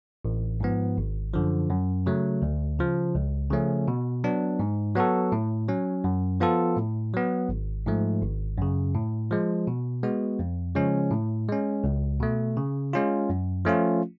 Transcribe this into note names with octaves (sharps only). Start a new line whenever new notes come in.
A1
G#2 F3 B3
G#1
F#2 D3 F3
F#2
C#3 F#3 A3
D2
C#3 F3
C#2
C#3 F3 A3 C#4
B2
F#3 B3 D4
G#2
F#3 B3 F#4 A4
A2
F#3 C#4
F#2
F3 B3 F4 A4
A2
F#3 B3
G#1
G#2 F3 A3
G#1
F#2 C#3
A2
F3 G#3
B2
G#3 B3 F#4
F2
C#3 F3 G#3 C#4
A2
G#3 C#4
C#2
B2 A3
C#3
G#3 C#4 F4
F#2
F3 A3 C#4 F4